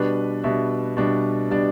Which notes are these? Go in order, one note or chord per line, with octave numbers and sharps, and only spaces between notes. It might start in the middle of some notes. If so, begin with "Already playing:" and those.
Already playing: B2 G3 D4 B4
B2 G3 D4 E5
B2 G3 D4
B2 G3 D4 D5